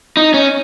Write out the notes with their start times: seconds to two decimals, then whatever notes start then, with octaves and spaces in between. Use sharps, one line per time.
0.17 D#4
0.34 C#4